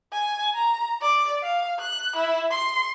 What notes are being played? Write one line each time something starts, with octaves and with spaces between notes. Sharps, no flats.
G#5
A#5
D5
F5
F#6
E4
C6